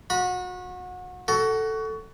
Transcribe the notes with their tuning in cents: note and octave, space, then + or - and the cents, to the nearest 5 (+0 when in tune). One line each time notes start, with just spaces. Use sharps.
F#4 -30 B5 -30
F#4 +20 A4 +5